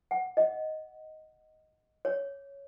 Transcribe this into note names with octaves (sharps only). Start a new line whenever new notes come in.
F#5
D#5
C#5